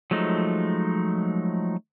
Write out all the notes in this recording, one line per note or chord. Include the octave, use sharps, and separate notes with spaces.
F3 F#3 G#3 A3 D#4